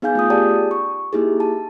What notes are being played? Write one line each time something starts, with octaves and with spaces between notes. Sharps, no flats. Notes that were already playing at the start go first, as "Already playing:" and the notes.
B3 D#4 G#4 F5 G#5 G6
A3 F4 D#6
G4 G#4 D5 G5 A5
C#6
A#3 D#4 E4 G4 G#4
A5